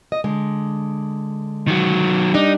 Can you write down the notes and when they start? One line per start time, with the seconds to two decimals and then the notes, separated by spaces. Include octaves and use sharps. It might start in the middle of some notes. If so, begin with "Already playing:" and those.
0.12 D#5
0.24 D3 G#3
1.67 D#3 F#3
2.34 G3 D4 D#4